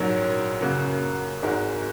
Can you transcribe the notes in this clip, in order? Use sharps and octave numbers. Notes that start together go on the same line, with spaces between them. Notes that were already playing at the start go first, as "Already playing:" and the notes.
Already playing: A#1 G#2 F#3 C#4 A#4
F#2 C#3 A#3 F#4
G#1 G#2 G#3 F#4 A#4